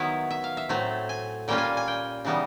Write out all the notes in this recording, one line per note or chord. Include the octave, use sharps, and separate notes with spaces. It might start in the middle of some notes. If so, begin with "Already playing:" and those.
Already playing: D#3 F#3 B3 E4 E5
E5
F5
E5
A2 F#3 A3 C4
G#5
A#2 G3 A#3 C#4 F4 G5
G#5
G#5
G5
C#3 E3 G3 B3 D#4